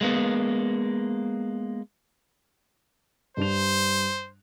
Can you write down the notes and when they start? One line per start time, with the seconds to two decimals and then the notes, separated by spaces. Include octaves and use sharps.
0.01 G#3 A#3 B3
3.37 G2 D4 C5 F7